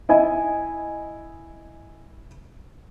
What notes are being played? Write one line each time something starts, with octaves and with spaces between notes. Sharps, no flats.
E4 D#5 G#5